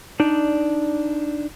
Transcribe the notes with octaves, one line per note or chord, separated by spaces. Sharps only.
D4 D#4 D5